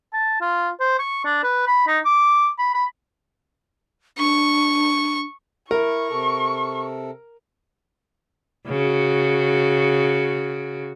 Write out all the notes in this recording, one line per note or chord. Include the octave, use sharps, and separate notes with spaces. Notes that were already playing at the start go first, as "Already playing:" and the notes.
A5
F4
C5
C#6
D4
B4
B5
D#4
D6
B5
B5
D4 C#6
E4 A#4 C#6
C3 A4
C#3 F#4